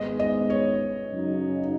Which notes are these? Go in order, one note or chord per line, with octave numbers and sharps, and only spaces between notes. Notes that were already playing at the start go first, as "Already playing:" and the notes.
Already playing: G#1 G#2 G#3 B3 D#5
D#5
C#5
F#2 C#3 F#3 D#4